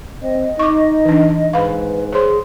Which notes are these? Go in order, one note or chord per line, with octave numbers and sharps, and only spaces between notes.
C4 D#5
D#4 C#6 D6
E3 D4
G#2 B4 F5 B5
G#4 C5 C#5 C6